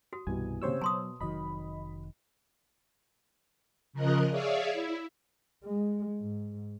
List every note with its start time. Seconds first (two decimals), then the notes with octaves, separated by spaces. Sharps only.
0.13 F#4 D#6
0.27 C2 G2 B2 E3 G3 G#5
0.62 C#3 G#3 A#3 C4 G4 C5 C#5 E6
0.82 B2 F#3 A5 C6 D#6
1.21 F1 D#3 F#3 D#5 B5
3.93 C#3 F3 A#4 D#5 F#6
4.30 G#4 C#5 D5 E5 F5
4.72 E4
5.65 G#3
6.19 G#2